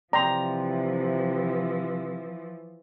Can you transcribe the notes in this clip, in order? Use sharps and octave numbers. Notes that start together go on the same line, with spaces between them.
C3 E3 F3 D5 G5 A#5 C6